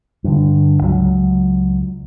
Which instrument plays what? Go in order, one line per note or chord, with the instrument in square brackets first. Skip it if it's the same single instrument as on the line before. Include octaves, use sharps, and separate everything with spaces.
[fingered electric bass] G2 D3
C#2 F#3